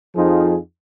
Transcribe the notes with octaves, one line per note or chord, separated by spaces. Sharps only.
F2 F3 D#4 F4 G#4